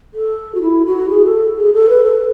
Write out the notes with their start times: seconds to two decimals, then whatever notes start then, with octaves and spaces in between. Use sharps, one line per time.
0.14 A4
0.55 F#4
0.62 E4
0.86 F#4
1.09 G#4
1.25 A4
1.58 G#4
1.73 A4
1.89 B4
2.04 A4